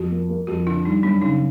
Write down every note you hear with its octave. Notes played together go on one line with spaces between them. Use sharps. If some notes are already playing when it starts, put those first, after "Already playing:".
Already playing: F2 F#4
A#3
A#3
F2 F#4
D3 E4
G3 D#4
F#2 D4
C#3 D#4